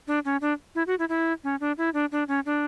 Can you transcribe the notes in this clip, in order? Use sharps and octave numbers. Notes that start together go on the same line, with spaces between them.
D4
C#4
D4
E4
F#4
E4
E4
C#4
D4
E4
D4
D4
C#4
D4